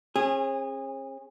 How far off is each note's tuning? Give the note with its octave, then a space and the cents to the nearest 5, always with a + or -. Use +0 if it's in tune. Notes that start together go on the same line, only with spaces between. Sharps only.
C#4 -45 G#4 -15